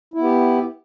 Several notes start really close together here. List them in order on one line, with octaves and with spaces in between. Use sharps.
E4 B3 G4